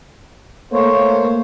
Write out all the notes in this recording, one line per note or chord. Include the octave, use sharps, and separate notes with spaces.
A3 A#3 A#4 C5 C#5